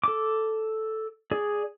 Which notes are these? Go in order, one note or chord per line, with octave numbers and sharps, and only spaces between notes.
A4 D6
G#4 D5